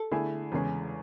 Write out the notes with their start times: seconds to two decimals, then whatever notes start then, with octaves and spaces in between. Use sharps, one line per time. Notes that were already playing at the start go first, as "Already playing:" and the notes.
Already playing: A4
0.11 D3 A3 E4 G#4
0.52 E2 C#3 G#3 C#4 G#4